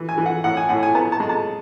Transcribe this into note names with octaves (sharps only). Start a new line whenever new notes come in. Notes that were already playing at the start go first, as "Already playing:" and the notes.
Already playing: E3
G#5
E3
F#5
A2 F#5
G#5
A2 F#5
G#5
B3 A5
A5
G#3
A5